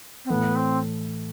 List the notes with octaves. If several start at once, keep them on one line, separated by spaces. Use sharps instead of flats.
C4
A2 E3 A3 B3
C4